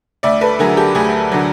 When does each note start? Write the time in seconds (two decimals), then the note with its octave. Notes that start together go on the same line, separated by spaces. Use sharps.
0.23 D2 D5 E5
0.41 A4 B4
0.59 D3 F#3 G#4 A#4
0.77 G4 A4
0.95 D2 G#4
1.31 D3 F#3